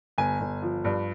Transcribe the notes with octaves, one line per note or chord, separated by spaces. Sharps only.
G1 G#5
G1
F3
G2